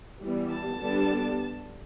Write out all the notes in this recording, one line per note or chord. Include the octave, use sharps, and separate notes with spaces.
E3 G3 B3
A5
D3 G3 B3 D4